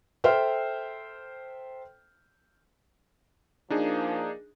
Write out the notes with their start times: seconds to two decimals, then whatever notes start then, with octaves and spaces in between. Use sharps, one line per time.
0.24 A4 C5 E5 G5 F6
3.70 F3 A#3 D4 D#4 G#4